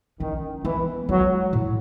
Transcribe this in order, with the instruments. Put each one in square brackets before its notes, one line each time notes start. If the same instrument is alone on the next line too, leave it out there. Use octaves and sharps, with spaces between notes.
[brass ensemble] D#3 [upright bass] C#4
[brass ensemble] E3 [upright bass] B3
[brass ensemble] F#3 [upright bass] G#3
[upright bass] A2